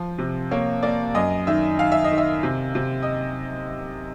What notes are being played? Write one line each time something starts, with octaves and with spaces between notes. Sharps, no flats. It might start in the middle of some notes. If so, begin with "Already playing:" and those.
Already playing: F3
C3
A#3 C#5
A#3 D5
F#2 D#5
D#3 E5
D#3 F5
E5
D#5
D#3
E5
C3
C3
D#5